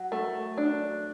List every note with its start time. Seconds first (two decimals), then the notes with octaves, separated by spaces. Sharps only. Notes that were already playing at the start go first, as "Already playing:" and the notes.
Already playing: F#3
0.12 A3
0.58 D4